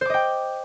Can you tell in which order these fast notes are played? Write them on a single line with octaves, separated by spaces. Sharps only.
C5 D6 D#5 G5